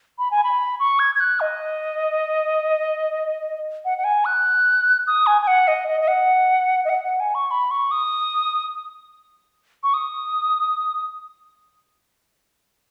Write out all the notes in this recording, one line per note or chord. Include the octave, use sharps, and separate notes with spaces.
B5
G#5
B5
C#6
G#6
G#6
F#6
D#5
F#5
F#5
G#5
F#6
D#6
G#5
G#5
F#5
D#5
D#5
D#5
F#5
D#5
F#5
F#5
G#5
C#6
B5
C#6
D#6
C#6
D#6